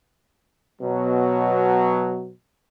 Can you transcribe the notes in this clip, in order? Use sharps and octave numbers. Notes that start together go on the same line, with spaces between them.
B2 F#3